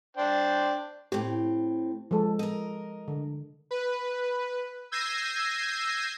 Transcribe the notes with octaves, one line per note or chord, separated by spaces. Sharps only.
D4 C5 G5
A2 C4 G4
F3 G#3 A4
A#4 D#5
D3
B4
E6 G6 G#6 A#6 C7 D#7